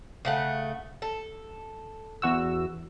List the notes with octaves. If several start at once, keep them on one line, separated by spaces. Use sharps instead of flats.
C#3 A3 F#5
A4
E2 F#4 E6